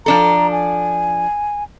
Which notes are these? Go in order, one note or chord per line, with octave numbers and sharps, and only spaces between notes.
F3 D4 A4 A#5
G#5